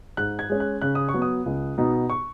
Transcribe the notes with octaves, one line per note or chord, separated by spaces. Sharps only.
G#2 F#6
G#6
G#3 C#4
F#6
C#3 F#6
D#6
C#6
F#3 B3
D#6
C#2
B2 B3 D#4
C#6